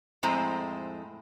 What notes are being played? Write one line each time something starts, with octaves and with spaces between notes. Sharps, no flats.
F2 A2 G#3 C4 C5 A#5